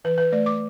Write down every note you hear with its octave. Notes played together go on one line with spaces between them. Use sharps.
E3 B4
B4
A3 D5
D6